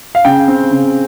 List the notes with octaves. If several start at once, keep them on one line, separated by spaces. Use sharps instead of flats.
F5
C#3 G5
C4
C#3